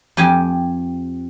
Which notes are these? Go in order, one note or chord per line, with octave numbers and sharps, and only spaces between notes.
F2 G4 G#5